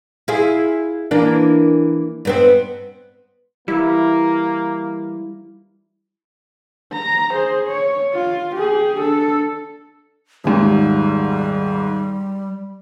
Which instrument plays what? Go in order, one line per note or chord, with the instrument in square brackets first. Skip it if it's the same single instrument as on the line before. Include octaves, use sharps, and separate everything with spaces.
[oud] E4 F4 G#4
E3 A#3 D4
G2 B3 C4
[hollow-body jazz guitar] E3 G3 [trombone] A#3 [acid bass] E4
[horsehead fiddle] A#5
G#4 C5
C#5
F4
G4 G#4
D4 A4
[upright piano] D#1 G#2 [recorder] G3